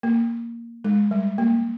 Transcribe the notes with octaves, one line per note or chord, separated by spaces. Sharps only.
A#3
G#3
G3
A#3